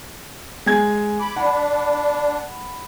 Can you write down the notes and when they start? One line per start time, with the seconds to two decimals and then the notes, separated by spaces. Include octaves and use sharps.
0.66 G#3 G#5 G#6
1.20 B5 D6
1.36 D4 F#5 B5